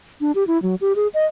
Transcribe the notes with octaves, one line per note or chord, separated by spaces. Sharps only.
D4
G4
E4
F#3
G4
G#4
D#5